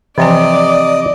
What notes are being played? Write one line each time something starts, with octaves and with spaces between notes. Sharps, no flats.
C3 E3 F3 D5 D#5 G#5